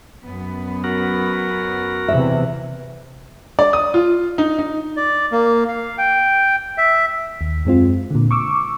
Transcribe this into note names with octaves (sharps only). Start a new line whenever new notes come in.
F#2 B3
F#4 A#4
E2 C3 E3 E5
D5
D#6
F4
D#4
D#4
D5
A#3
F5
G5
E5
D#2
F#2 G#3 C4 F4
A#2 D3
C#6 D6 E6